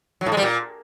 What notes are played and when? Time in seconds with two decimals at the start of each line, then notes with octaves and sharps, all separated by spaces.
0.21 F#3
0.26 A2
0.32 G#3
0.37 G3
0.42 A#2